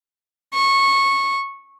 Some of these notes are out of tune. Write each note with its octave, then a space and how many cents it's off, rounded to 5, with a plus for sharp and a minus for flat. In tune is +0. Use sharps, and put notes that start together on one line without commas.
C#6 -15